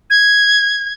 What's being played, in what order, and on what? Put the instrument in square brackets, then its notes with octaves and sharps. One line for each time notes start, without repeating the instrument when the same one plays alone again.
[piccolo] G#6